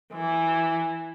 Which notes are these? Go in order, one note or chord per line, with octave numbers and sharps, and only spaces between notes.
E3